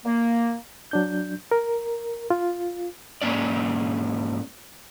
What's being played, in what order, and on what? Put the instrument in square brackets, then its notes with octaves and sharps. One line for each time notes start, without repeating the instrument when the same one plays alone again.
[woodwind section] A#3
[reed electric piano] F#3 D4 G6
A#4
F4
[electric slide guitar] G#2 D3 A#3 C#4 D5